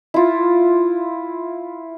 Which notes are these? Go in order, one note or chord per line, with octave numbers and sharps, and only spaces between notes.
E4 F4